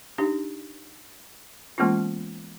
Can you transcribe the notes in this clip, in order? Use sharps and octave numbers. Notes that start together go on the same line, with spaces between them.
D4 D#4 G4
E3 G#3 A#3 B3 C#4 F4